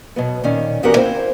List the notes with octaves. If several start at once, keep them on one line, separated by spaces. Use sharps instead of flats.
B2 F#3 B3
A#2 D#3 C#4
E2 B3 F#4 G4 A#4 F#5
A#3 C4 E4 C5